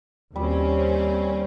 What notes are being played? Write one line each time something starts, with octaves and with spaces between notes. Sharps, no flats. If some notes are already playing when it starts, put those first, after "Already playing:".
D#2 G3 C4 C#4